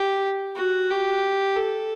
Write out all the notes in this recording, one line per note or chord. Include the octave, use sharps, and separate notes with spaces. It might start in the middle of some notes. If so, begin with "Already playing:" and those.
Already playing: G4
F#4
G4
A4